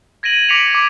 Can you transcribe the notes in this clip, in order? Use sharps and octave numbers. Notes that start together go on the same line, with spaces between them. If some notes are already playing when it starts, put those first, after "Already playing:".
G#6 A#6 D7 D#7 F#7
D6 A#6 B6 C#7 D7 F7
D6